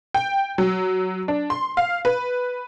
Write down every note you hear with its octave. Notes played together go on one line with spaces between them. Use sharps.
G5
F#3
D4
C6
F5
B4